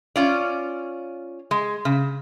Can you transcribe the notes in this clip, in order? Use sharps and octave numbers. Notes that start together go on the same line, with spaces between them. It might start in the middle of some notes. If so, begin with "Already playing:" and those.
C#4 F4 D5
G#3
C#3